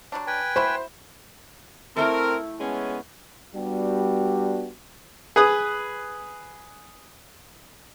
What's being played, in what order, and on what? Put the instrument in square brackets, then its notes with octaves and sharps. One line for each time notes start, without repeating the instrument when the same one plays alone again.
[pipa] F#3 G3 D4
[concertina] B4 G5 G#5
[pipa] E4 F#4 B5 [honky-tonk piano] C5
[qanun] A3 E4 G5 [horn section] C4 A#4
[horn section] G#3 B3 C#4
[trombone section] G3 B3 D4 F#4 G4
[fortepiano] G#4 B4 D#6